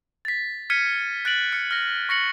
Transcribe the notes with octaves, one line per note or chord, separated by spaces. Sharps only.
A6 B6
F6 G#6 B6 C#7 D#7
F#6 A6 D7 F#7
F6 C#7
F6 A#6
C#6 A#6 C#7 F#7